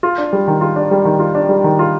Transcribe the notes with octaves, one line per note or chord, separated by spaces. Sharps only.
F4
D4
G3
D#3
F4
D4
G3
D#3
F4
D4
G3
D#3
F4